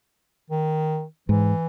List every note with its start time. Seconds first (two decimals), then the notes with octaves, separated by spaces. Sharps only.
0.50 D#3
1.29 G#2 E3